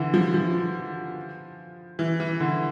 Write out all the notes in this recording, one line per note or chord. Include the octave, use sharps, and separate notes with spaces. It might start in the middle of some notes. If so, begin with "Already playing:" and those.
Already playing: D3 E3
F3
F3
E3
E3
D3